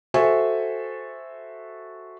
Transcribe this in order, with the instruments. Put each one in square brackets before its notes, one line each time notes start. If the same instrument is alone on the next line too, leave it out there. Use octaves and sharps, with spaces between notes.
[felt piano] F#4 A4 C5 E5 G#5 C#6